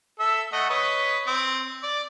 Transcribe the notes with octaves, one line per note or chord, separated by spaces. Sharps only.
A4 E5 E6
A3 D#5 F#5
B4 C#5 D#5
C4
D5